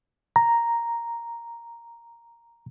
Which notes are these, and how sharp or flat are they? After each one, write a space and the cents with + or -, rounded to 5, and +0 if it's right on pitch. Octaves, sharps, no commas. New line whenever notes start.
A#5 +0